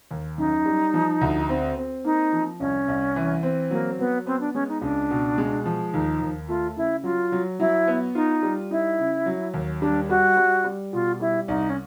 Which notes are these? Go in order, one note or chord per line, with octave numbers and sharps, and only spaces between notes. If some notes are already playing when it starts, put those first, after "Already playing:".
D#2
F#2 D#4
G3
F3
D2
C4
C4
A#3 D#4
F3
C2 C#4
C2
E3
C4
F#3 A#3
F#3 B3
B3 C4
D4
G#3 C#4
D#4
C#2 D4
B2
G#3
F3
D#2 D#4
D#2
A3 F4
C#3 E4
F#3 F4
F#3
F#3 E4
B3
D#4 F4
G3
D#4 E4
C#3
F#3
D#2
G3 D4
G3 F#4
G3
G3
B2 F4
G3 E4
C2 D#4
C#4